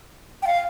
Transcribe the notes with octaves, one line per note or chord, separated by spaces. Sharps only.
G5
F5